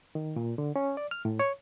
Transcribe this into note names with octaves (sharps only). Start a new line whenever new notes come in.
D#3
A#2
D3
C#4
D5
F6
A2
C#5